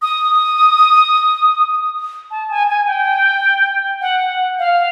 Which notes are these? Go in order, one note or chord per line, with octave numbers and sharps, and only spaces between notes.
D#6
A5
G#5
G#5
G5
F#5
F5